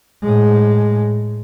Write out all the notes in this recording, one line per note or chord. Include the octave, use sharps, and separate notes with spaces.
A2 G#3